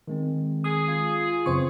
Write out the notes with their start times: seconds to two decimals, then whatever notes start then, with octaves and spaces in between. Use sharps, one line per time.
0.08 D#3 G#3 C4
0.64 G#4 D#6
0.88 F4
1.46 F#2 C#3 E3 C4 C5 C#6